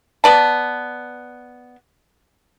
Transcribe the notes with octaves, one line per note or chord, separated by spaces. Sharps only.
B3 D5 A5